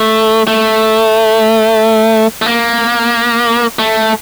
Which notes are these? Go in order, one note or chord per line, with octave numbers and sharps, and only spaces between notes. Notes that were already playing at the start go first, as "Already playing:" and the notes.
Already playing: A3
A3
A3
A#3
A3